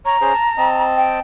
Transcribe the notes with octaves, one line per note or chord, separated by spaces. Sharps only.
C#5 A#5
C#4 G#4 C5
A5
C4 D#5 A5
G5